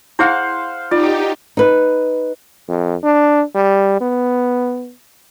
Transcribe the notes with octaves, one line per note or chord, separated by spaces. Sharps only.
E4 G#4 C5 F5 F#5
D#4 F4 G4 D5
D#4 B4
F2
D4
G3
B3